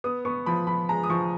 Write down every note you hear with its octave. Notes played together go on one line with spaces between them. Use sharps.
B3 D#6
B3 C#6
F3 B5
F3 B5
G#3 A#5
D#6
F3 C#6